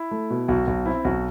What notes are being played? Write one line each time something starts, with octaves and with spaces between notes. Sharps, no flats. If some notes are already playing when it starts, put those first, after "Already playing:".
Already playing: E4
A3
B2
B1 F#4
B1 F#4
C4 E4
B1 F#4